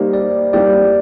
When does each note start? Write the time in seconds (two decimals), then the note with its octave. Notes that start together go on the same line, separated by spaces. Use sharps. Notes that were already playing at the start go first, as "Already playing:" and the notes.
Already playing: G3 A#3 D#4 G4 C5
0.13 D5
0.53 G3 A#3 D#4 G4 D5